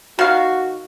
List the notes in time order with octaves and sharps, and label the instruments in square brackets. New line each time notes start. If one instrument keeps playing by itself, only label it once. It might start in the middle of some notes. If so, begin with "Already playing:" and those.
[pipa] D#3 F5 [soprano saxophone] F#4